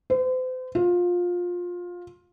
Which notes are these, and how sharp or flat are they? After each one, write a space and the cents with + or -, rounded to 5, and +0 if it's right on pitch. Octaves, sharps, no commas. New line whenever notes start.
C5 -40
F4 +20